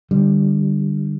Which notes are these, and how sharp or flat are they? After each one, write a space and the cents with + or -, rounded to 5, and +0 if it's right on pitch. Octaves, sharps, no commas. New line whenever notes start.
D3 +25 G3 +10